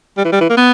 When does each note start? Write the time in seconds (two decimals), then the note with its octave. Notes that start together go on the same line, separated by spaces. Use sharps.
0.18 G3
0.25 E3
0.33 G3
0.41 E3
0.50 A#3
0.57 B3